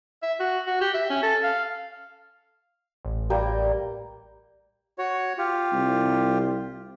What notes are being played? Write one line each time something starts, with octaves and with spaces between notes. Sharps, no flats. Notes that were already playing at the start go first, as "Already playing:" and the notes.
E5
F#4
F#4
G4
E5
C#4
A4
F5
A1
G3 A#3 G5
F#4 C#5
F4 G4
C2